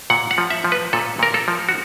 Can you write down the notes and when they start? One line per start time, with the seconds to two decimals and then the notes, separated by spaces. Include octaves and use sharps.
0.10 A#2 F#5
0.31 F#5
0.38 F3
0.50 E5
0.64 F3
0.72 B4
0.93 A#2 A4
1.19 A#2 A#4
1.34 A4
1.48 F3
1.69 F#4